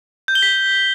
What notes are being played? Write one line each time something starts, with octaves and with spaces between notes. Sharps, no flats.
G6
G7
B6